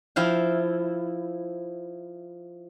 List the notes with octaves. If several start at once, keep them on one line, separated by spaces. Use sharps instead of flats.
F3 E4 F5 G5